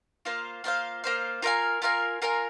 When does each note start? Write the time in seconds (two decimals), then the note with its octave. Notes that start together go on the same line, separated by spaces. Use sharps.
0.25 A#3 F4 C5 F5
0.64 A#3 F4 C5 F5
1.04 A#3 F4 C5 F5
1.42 F4 A#4 F5 G#5
1.82 F4 A#4 F5 G#5
2.22 F4 A#4 F5 G#5